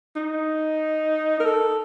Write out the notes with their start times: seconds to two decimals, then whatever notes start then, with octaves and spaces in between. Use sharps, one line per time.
0.16 D#4
1.40 A#4
1.45 A4